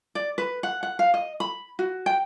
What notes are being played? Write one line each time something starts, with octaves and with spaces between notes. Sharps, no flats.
D5
B4
F#5
F#5
F5
D#5
B5
F#4
G5